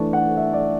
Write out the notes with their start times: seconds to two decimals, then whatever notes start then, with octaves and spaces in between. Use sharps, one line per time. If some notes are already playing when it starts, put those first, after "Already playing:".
Already playing: E3 A3 D4 A5 C#6
0.13 F#5
0.37 E5
0.53 D5